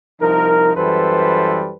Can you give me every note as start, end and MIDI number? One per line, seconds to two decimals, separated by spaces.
0.20 0.72 36
0.20 0.72 53
0.20 0.72 63
0.20 0.72 70
0.75 1.73 42
0.75 1.73 52
0.75 1.73 55
0.75 1.73 69
0.75 1.73 71
0.75 1.73 72